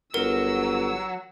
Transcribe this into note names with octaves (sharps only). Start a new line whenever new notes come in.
G1 F#3 A#4 E6